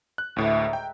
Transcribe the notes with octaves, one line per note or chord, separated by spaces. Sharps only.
F#6
D2 A2 G#3 B4 E5
A#5
G5